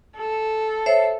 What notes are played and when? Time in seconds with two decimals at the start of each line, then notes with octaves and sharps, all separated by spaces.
0.17 A4
0.86 C5 C#5 E5